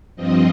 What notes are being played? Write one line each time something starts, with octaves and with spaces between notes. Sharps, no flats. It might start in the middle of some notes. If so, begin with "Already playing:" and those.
G2 F3 C4 D#5